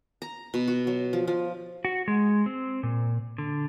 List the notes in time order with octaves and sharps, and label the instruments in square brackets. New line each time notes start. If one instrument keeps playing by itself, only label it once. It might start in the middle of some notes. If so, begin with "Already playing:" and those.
[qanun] A#5
B2
F#4
F#3
F3
F3
[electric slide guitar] F#4
G#3
C4
A#2
D3